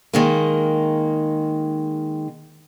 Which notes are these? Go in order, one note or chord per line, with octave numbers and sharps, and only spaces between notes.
D#3 G#3 A#3